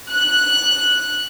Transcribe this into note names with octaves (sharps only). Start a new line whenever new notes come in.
F#6